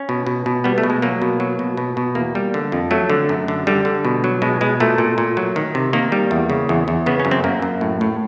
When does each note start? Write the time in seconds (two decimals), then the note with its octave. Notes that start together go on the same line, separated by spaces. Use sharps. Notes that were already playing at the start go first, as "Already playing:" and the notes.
Already playing: C#4
0.09 B2
0.27 B2
0.46 B2
0.64 G3 B3
0.78 A3
0.83 B2
0.90 G#3
1.02 F#3 A#3
1.22 B2
1.40 F#3
1.59 B2
1.77 B2
1.97 B2
2.15 E2 A#3
2.35 G3
2.54 D3
2.72 F2
2.91 F#3 A3
3.10 D3
3.29 F#2
3.48 D3
3.67 D3 G3
3.85 D3
4.05 B2
4.24 F#3
4.42 B2 G#3
4.61 B2 G#3
4.80 A#2 A3
4.98 A#2
5.18 A#2
5.37 F#3
5.56 D#3
5.75 C3
5.93 D#3 A#3
6.12 G3
6.31 E2
6.50 C#3
6.69 E2
6.88 E2
7.06 C#3 B3
7.19 C#4
7.25 F#2
7.31 C4
7.44 F#2 A#3
7.62 F#2
7.81 A2
8.01 A2